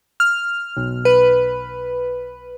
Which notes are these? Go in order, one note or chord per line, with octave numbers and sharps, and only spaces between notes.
F6
B1
B4